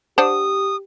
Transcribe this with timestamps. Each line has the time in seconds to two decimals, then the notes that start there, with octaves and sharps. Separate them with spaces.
0.18 D4 G4 C5 F#5 D#6 E7